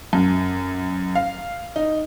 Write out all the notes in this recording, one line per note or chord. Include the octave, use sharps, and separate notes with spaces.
F#2
F5
D#4